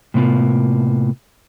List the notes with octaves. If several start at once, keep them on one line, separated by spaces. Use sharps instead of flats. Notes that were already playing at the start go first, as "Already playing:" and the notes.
A2 C3 A#3 B3 F4